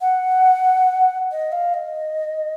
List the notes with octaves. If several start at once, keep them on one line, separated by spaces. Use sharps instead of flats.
F#5
D#5
F5
D#5